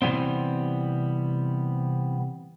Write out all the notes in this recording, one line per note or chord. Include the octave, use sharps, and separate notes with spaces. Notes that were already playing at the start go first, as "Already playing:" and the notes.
C3 E3 G3 B3 C4